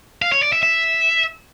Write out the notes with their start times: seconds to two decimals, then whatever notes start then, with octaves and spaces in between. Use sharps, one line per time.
0.22 F5
0.32 C#5
0.42 D5
0.53 E5
0.63 E5